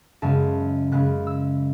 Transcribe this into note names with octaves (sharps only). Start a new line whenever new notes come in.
F#2 C#3 G#3 B3 A5
F#2 C#3 G#3 B3 F#6
E6